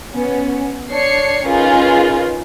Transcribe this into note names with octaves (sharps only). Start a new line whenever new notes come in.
B3 C#4
D4 C#5 C7 C#7
C#4 D#4 F4 G#4 A#4 B4